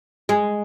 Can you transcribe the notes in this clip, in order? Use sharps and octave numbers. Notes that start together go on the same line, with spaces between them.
G#3